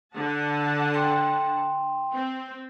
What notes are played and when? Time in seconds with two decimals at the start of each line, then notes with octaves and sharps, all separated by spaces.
0.14 D3 F#5 A5
0.94 G5 C6
2.14 C4